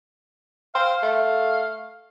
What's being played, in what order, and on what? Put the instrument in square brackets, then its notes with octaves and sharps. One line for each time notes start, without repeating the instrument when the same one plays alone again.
[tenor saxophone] C5 [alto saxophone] F5
[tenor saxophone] A3